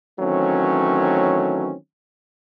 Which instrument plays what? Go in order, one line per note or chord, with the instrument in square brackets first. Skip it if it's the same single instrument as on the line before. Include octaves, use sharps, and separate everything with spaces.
[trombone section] D#3 E3 F#3 A3 C4 C#4